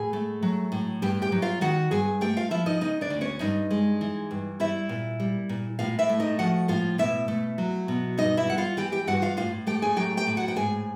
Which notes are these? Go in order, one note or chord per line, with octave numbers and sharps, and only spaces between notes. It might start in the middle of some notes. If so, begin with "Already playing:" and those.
Already playing: A2 G#4 G#5
A3
F#3
A2
G2 G4 G5
G4 G5
F#3
F4 F5
D#3 F#4 F#5
G2 G#4 G#5
A3 G4 G5
F4 F5
F3 E4 E5
D#4 D#5
C#3 D#4 D#5
D4 D5
D2
C#4 C#5
G2 D#4 D#5
G#3
E3
G2
G3 E4 E5
A#2
G3
A#2
A2 F4 F5
E4 E5
A3
D#4 D#5
F3 F#4 F#5
A2 F4 F5
B2 E4 E5
A3
F#3
B2
G2 D#4 D#5
E4 E5
G3 F#5
F4 F5
E3 G4 G5
G4 G5
G2 F#4 F#5
F4 F5
A2 F4 F5
A3 G4 G5
G#4 G#5
F#3 G4 G5
G4 G5
A2
F#4 F#5
G5
G#2 G#4 G#5